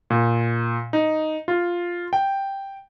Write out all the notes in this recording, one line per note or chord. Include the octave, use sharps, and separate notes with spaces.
A#2
D#4
F4
G5